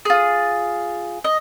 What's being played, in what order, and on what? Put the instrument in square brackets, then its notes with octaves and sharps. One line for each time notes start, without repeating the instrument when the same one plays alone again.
[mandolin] F4 G#4
D#5